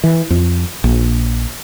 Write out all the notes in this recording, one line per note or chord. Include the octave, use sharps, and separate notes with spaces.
E3
F2
A#1